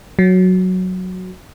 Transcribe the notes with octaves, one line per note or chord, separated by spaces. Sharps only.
F#3